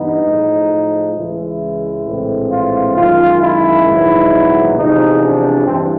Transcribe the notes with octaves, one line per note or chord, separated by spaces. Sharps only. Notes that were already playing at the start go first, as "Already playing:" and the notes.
Already playing: G2 E3 B3 D#4
A2 F3 G#3
C#2 C#3 E3 G#3 E4
A#1 A2 E3 G#3 C4
F4
F#2 D#3 G#3 F4
E4
A#1 G#2 D#3 F#3 B3
E2 C3 F3 G#3 D#4
D4
G2 E3 C4